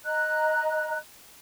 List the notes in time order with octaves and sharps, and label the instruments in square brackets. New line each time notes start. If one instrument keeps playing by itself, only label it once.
[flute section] D#5 A#5 F#6